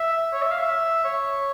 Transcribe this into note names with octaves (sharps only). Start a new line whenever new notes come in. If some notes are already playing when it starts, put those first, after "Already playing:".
Already playing: E5
C#5
E5
F5
E5
C#5